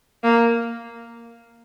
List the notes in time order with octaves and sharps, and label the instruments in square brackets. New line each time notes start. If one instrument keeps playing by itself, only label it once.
[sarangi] A#3